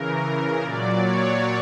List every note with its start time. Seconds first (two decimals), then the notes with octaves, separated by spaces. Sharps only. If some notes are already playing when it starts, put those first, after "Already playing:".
Already playing: C#3 E3 A#4
0.62 A#2 F#3 D5
1.01 C#5